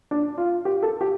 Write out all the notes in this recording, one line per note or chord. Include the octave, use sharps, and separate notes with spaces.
D4
F4
G4
A4
G4